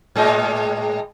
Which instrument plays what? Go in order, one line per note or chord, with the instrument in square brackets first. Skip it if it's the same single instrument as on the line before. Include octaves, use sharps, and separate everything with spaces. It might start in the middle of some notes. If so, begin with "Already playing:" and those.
[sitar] A2 G#3 D#5